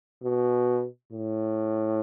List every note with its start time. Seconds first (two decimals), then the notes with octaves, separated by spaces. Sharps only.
0.23 B2
1.12 A2